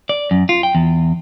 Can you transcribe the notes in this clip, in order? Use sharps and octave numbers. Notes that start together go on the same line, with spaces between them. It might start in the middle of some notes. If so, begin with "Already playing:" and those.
D5
F#2
F4
G5
E2